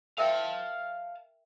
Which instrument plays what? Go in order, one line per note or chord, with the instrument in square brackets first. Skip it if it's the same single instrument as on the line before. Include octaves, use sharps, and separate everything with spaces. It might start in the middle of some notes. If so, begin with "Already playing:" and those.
[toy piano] A#4 E5 G5 [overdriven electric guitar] F5 A5